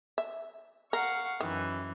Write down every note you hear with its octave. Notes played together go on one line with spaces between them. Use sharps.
E5
A#4 F5 F#5 C#6
F#2 D#3 E3